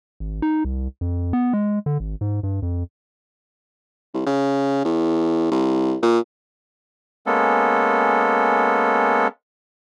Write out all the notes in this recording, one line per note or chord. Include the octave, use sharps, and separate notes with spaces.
G#1
D#4
C2
F2
B3
G#3
D3
G#1
G#2
G2
F2
C2
C#3
E2
C2
A#2
G#3 A#3 B3 C#4 A4